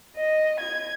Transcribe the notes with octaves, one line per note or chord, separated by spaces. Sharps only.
D#5
G#6